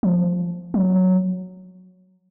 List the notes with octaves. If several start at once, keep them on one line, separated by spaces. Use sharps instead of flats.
F3
F#3